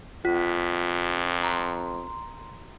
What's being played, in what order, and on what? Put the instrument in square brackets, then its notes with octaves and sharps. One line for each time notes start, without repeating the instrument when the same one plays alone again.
[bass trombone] F2 [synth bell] F4 B6
[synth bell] A#5 C6